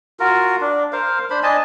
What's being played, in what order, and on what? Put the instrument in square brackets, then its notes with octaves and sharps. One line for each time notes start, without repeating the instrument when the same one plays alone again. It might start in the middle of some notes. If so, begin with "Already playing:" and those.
[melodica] F4 F#4 A#4
D4
A#4 C5 F5
D4 C5 B5
D4 D#5 G#5 A5